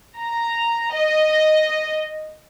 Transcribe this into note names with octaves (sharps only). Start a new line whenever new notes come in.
A#5
D#5